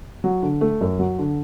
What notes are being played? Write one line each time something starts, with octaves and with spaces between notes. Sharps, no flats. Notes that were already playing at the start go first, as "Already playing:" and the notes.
F#3
D3
A3
F#2
F#3
D3